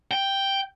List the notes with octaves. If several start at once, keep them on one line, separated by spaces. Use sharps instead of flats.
G5